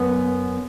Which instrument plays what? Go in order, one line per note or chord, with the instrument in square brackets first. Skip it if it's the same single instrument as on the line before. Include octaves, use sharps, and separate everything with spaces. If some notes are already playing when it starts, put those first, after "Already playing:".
Already playing: [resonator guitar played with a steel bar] F#2 B3